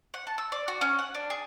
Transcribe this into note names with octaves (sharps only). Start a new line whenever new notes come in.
F#5
A5
E6
D5
F#4
C#4
F#5
D4
G#4